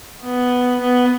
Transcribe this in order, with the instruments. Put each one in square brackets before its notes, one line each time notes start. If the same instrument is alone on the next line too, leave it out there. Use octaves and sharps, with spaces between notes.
[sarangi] B3
B3